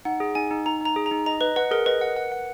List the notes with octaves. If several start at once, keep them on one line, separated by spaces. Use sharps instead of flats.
D#4 F#5
G#4
D#4 G#5
D#4
D#4 A#5
D#4 A#5
G#4
A#5
D#4
D#5 A#5
B4 D#5
B4 F#5
G#4 A#4
B4 D#5
F#5
F#5
F#5